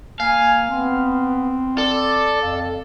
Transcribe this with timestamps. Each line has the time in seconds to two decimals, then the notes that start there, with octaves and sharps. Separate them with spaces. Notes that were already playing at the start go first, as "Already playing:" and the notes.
0.20 A#3 F5 G#5
0.70 B3 C4
1.78 A4 D5
2.42 F2 F5